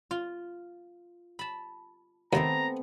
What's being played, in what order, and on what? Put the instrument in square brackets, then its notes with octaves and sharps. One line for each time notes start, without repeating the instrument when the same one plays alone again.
[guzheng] F4
A5 B5
[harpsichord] D#2 [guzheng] A3 B3 C4 [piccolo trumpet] A#5